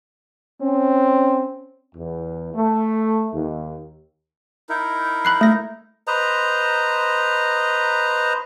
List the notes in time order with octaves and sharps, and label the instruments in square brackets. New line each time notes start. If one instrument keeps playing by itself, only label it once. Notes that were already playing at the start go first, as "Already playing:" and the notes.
[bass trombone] C4 [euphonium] C#4
[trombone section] E2
A3
D#2
[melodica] D#4 E4 A#4
[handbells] B5 F#6 C7
A3 A#6
[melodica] B4 C5 D#5 A#5